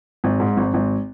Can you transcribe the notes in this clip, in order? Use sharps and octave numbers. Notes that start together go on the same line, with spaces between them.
G#1
G#2
G#1
G#1